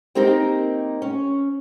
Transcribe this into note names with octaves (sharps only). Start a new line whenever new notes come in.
A#3 C4 D#4 G4 A#4
C#4